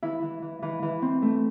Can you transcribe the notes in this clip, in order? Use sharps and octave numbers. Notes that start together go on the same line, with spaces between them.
E3 E4
E3
E3
E3
E3
C4
A3